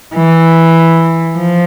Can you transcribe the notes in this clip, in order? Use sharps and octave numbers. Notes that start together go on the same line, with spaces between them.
E3
F3